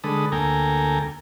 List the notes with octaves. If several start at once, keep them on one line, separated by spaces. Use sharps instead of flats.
D3 G#3 A4 B4 D#6
D2 A#3 A4 G5 G#5 A#5